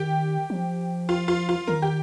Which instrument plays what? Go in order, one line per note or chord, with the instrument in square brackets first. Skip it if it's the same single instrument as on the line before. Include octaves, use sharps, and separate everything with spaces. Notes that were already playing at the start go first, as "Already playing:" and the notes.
Already playing: [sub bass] D#3 [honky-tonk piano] G4
[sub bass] F3
[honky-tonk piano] F4
F4
F4
[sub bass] D#3 [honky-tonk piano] A#4
[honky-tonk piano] G4